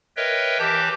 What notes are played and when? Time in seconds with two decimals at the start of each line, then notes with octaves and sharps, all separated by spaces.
0.17 A#4 B4 C#5 D#5 E5 G5
0.59 E3 G4 A5 D6 G6